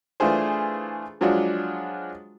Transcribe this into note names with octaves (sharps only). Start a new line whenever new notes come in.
E3 A3 D4 F4 G#4 C5
F3 F#3 G#3 D4 F4 F#4